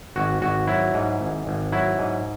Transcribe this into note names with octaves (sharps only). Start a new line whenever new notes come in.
G#1 F#4
G#1 F#4
F#3 E4
G#2
G#1
G#1
F#3 E4
G#2